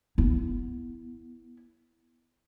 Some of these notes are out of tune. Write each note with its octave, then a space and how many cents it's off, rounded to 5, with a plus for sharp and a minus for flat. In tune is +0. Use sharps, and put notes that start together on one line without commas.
B3 +0 E4 +0